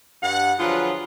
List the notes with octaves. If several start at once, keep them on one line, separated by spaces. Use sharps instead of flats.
G2 F#5
D3 F3 F#3 F4 G#4 B4